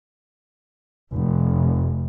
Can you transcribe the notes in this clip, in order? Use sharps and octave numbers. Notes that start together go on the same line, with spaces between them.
F1